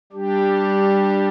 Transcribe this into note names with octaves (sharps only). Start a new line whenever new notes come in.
G3 D4 G4